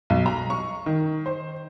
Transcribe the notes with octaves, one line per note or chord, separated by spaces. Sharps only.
B1
A#5
C#6
D#3
C5